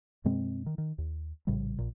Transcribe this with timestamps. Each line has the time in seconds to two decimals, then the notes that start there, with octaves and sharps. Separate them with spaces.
0.24 F#2 B2 G#3 C4
0.66 D#3
0.78 D#3
0.98 D#2
1.47 A#1 A2 C#3 G3
1.78 A#1 A#2